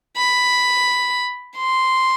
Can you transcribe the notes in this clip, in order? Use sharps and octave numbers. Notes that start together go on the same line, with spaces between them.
B5
C6